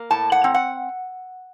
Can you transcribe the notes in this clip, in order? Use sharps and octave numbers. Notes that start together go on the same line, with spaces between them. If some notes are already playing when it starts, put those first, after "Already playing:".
Already playing: A#3
A2 A5
F#5
C4
F#5